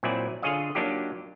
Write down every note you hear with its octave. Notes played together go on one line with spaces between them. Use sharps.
A#2 F#3 C4 E4 D5 G#5
D3 F4 G#4 C#5 D#5 F5
F#3 A#3 D4 D#4 F4 G4